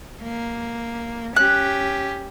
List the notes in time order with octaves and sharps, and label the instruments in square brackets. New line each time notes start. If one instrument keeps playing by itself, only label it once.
[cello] A#3
[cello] C#4 G4 [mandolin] F#6